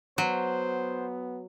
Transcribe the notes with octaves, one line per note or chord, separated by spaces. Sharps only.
F#3 B3 C5